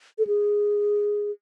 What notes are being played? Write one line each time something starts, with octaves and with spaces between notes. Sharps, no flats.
A4
G#4